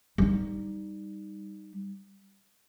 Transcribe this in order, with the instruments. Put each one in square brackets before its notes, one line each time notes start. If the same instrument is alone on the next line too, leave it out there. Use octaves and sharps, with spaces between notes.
[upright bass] G3 D#4